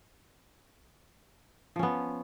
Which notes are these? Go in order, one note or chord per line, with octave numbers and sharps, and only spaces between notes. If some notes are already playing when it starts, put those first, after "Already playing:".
F3 B3 C#4